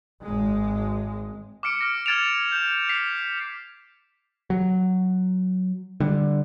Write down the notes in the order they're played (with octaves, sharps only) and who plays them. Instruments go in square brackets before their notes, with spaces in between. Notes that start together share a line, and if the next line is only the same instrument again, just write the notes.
[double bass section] G#1 G#3
[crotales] D6 F6 C#7 D7
F6 A#6
F6 G#6 A6 D7 E7 F7
G6 E7
B6 C7 F7
[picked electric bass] F#3
D3 G3